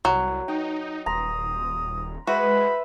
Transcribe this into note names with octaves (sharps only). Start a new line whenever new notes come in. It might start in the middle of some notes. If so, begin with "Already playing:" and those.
C2 F#3
D#4 G5
D#1 A#5 C6 D#6
G#3 F#4 B4 C5 E5 B5